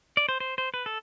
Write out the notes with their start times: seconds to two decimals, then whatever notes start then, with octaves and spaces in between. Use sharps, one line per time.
0.17 D5
0.29 C5
0.40 C5
0.58 C5
0.74 B4
0.86 A4